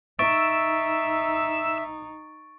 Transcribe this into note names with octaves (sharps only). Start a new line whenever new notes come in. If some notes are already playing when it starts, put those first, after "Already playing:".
D#4 E5 C#6 E6 A6 D7